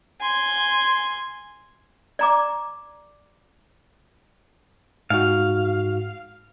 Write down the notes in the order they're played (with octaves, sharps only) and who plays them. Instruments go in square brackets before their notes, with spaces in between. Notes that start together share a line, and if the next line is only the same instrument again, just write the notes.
[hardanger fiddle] G#5 C6
[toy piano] D5 A#5 D6
[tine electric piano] G#2 F#4 [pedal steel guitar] F5